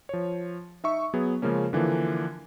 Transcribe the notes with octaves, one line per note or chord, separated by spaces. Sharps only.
F3 C#5
D#4 E5 C#6
F#3 B3 G#4
C#3 F3 G#3 A#3 C#4
D3 E3 F3 A#3